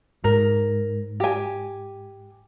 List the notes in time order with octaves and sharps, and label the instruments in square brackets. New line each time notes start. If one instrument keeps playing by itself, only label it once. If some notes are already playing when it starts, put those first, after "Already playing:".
[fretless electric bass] G#2 [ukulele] A#4
[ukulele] G4 G#5